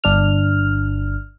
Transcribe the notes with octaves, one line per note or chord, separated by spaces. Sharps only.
G1 D4 F6